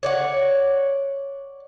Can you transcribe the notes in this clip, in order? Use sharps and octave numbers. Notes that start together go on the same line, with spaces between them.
C#5 D5 F#5